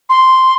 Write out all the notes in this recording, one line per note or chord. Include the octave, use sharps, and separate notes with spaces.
C6